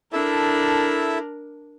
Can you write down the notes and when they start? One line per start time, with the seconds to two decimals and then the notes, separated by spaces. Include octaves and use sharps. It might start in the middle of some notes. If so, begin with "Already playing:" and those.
0.13 D4 E4 A4 A#4 E5